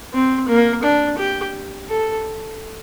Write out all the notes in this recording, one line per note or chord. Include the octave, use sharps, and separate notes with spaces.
C4
A#3
D4
G4
A4